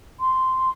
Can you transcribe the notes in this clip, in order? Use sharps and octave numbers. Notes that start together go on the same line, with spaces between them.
C6